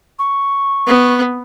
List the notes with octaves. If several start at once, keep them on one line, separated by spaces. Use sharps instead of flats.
C#6
B3